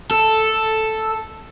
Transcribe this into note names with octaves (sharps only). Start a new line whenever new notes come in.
A4